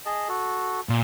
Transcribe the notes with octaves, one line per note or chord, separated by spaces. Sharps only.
G#4 D#5 A5
F#4 A4
A#2